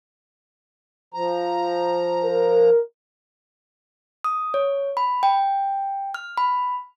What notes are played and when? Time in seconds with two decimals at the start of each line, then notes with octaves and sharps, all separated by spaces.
1.14 F3 A#5
2.24 A#4
4.24 D#6
4.54 C#5
4.97 B5
5.23 G5
6.14 F6
6.38 B5